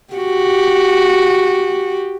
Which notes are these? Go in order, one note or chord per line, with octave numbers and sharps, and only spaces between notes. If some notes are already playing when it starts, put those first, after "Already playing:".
F#4 G4